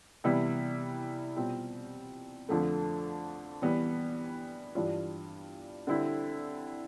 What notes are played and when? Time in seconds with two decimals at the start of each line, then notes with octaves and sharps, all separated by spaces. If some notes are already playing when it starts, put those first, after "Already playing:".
0.24 C3 E3 G3 B3 E4
1.36 B2 G3 C4 F4
2.49 F2 D3 F3 A3
3.62 E3 G3 B3
4.75 G2 E3 G3 D4 F4
5.87 D3 G3 C4 E4